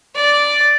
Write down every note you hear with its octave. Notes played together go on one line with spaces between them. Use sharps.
D5